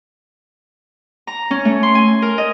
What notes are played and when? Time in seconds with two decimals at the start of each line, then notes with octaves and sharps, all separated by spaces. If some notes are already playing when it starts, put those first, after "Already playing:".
1.27 A#5
1.51 C#4
1.65 A3
1.83 C6
1.95 G#5
2.22 A#4
2.38 D#5